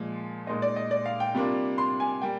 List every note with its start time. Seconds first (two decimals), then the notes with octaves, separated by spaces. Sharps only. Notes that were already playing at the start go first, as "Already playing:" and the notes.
Already playing: A#2 F3 G#3
0.47 A#2 G#3 D#4 D#5
0.62 D5
0.76 D#5
0.91 D5
1.06 F5
1.20 G5
1.35 C3 G3 A#3 D4 F4
1.78 C6
2.00 G#5
2.22 G3 A#3 G5